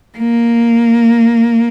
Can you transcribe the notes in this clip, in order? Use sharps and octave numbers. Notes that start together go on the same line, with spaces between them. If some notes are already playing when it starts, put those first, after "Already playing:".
A#3